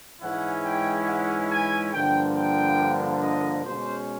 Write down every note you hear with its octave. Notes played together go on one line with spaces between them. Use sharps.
G#2 E3 G#3 C#4 E4 F#5
G5
F#5
G#5
G2 D3 F3 A#3 G5
G5
D#5
B2 G#3 C#4 C5